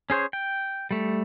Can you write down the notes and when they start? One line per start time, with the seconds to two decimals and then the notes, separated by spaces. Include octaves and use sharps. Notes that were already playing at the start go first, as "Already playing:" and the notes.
0.10 C#4 G#4 C5 C#5
0.33 G5
0.91 G3 A3